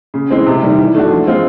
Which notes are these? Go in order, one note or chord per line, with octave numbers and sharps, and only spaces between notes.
C#3
E3 G#3 C4
C3
D#3 G3
E3
A3 D4 F#4
F3
G#3 C4 F4